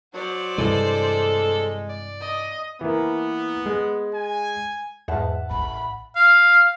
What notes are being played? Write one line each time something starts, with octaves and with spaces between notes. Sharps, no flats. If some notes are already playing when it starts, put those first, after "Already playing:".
F#3 C5 D5
G2 C3 E3 G#3 A4
D5
D#5
E3 A#3 B3
G#3
G#5
E2 G#2 E5 F#5 A5
A1 B5
F5